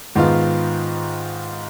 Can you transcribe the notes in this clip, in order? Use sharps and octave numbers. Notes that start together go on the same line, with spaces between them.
G#2 D#3 B3 F4